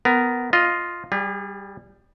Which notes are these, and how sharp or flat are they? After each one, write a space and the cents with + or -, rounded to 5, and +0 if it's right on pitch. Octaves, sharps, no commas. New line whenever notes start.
B3 +15 A#4 +0
F4 +0 D#5 +0
G3 +0 G#4 -35